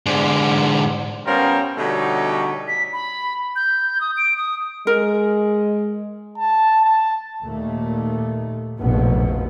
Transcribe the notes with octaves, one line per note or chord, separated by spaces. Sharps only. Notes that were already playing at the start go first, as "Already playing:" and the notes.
G#2 D3
G3 B3 C#4 F4 A#4 C5
B2 D3 G3 A3 D#4 C#5
B6
B5
G6
D#6
D7
D#6
G#3 A#4
A5
A5
D#2 A#2 D#3 A3
F1 A#1 G#2 B2 F3 B3